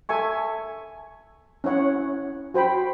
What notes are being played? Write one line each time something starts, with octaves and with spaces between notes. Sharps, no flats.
A4 E5 G#5 C#6
C#4 E4 C#5 F#5
F#4 C5 G5 B5